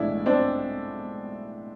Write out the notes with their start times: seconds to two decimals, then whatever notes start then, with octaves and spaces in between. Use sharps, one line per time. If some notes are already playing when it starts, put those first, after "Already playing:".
Already playing: B1 A2 E3 G#3 D4 E4
0.26 C4 D4